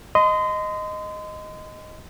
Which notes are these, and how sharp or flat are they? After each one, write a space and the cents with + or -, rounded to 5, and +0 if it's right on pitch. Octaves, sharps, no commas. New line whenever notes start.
D#5 +0 C6 -35